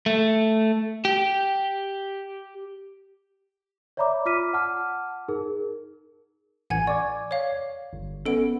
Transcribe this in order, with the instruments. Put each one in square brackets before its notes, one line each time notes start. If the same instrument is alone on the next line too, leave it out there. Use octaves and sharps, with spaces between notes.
[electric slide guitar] A3
G4
[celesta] C#5 D5 E5 A#5 B5 D6
F4 D6 F6 B6 D#7
F#5 A5 D6 F6
D#4 G#4 A#4
[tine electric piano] A1 [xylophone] F#5 G#5 G#6
[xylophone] D5 [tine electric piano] C#6 D6 G#6
[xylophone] C#5 F5
[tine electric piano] G1
[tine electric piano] B3 C#4 [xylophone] A4 D7